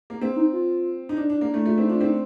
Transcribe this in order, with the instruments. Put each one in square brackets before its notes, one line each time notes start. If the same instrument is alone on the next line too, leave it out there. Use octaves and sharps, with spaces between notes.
[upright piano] A#3
[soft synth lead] A#3 [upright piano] C4
[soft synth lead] D#4
F4
[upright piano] D#4
D4
D4
A#3
A3
[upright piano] A3 [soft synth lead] F4
[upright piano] C4 [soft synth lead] D#4
[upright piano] D4 [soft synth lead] F4
[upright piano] C4 [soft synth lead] D#4